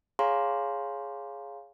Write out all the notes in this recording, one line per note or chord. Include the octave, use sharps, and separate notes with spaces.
G#4 C#5 F5 G#5 A#5 C6